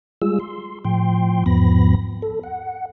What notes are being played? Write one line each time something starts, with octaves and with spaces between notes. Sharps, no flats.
G3 G#3 F4 G#4 E6
C6
A2 F3 G5 C6
E2 G#2 F3 B3 B5 A#6
A4
F#5